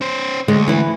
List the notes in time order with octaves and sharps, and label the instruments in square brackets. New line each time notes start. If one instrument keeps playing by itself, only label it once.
[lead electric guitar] C#4 C5
[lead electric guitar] D2 [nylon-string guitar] G#3
[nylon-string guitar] E3 E4